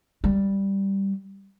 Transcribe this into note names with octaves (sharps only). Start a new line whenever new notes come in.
G3